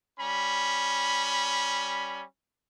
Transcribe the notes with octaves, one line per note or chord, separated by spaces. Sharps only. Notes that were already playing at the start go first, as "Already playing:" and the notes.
G3 C#4 B5